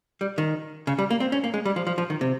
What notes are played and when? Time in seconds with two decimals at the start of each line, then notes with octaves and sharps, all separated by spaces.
0.21 G3
0.38 D#3
0.87 C#3
0.99 G3
1.10 A#3
1.20 C4
1.32 C#4
1.44 A#3
1.54 G#3
1.65 G3
1.76 F3
1.87 F3
1.98 F3
2.10 D#3
2.21 C3